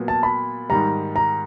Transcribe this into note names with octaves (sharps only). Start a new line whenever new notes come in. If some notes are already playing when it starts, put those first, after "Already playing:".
Already playing: A#2 F#3 B3
A5
B5
G#2 D#3 G3 A#5
A#5